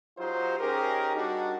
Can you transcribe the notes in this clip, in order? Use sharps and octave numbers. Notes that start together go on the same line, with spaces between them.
F#3 D#4 F4 G4 C5
C#4 D#4 G4 G#4 A#4
G3 D4 D#4 F#4